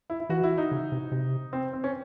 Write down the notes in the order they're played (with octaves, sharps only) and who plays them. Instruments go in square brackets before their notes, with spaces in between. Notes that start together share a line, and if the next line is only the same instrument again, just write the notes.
[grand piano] E4
E4
[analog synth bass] E3 [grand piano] F#4
[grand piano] E4
D#4
[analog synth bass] C#3
C3
C3
[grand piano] C4
C4
C#4